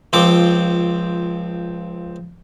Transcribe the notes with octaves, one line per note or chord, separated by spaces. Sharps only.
C#2 F3 C4 D6